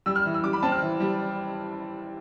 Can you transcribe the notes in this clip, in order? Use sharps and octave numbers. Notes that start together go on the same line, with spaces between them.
G3 E6
F6
E3
E6
G3 D6
B5
C4 A5
F6
E3
G3